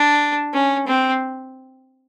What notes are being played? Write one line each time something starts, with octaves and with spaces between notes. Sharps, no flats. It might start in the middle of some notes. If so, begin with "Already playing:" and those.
Already playing: D4
C#4
C4